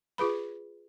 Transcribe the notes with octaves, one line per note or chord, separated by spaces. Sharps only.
F4 G#4 B4 B5